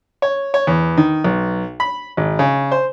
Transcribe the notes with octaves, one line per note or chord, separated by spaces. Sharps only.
C#5
C#5
E2
D#3
B1
B5
G#1
C#3
C5